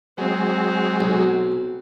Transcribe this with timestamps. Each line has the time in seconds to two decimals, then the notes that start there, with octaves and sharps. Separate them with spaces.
0.18 F#3 G#3 C4
1.00 B1